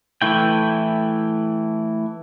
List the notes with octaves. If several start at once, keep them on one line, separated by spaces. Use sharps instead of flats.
E3 A3 E4 G5